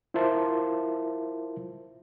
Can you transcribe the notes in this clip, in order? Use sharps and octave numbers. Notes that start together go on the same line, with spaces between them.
E4 F4 A#4 C5 E5 A5